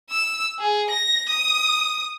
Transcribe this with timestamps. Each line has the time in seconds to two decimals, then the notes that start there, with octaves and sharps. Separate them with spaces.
0.10 E6
0.59 G#4
0.90 A#6
1.29 D#6